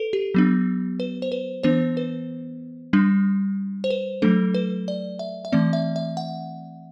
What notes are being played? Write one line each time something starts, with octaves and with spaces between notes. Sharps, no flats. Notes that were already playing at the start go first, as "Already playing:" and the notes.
Already playing: A4 B4
G4
F#3 B3 D4
B4
C5
B4
E3 B3 D4 C5
B4
G3 D4
C5
B4
F#3 A3 D4 A4
B4
D5
E5
E5
E3 A3 C4 D5
E5
E5
F#5